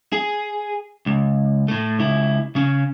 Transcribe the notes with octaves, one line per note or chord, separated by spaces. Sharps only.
G#4
C#2
A2 A3
C#2 E4
C#3 C#4